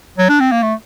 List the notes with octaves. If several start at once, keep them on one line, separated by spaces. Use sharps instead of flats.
F#3
D4
C4
A#3
A3